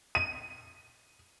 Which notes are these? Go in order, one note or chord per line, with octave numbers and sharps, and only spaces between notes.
D#7